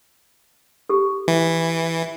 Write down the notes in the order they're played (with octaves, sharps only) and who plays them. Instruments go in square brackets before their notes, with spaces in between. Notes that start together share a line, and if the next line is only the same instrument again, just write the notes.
[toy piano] G4 A4
[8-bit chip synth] E3